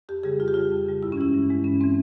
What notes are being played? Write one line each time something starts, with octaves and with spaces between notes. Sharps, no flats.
F2 G4
C#3 G3 G#4
F2 F4
G4
C#3 G3 F4
F2
C#3 G3
G2 E4
C#4
E3 G#3 E4
G2
E3 G#3
G2 C#4
E3 G#3 C4